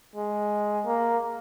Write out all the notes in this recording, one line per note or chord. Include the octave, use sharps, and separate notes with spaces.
G#3
A#3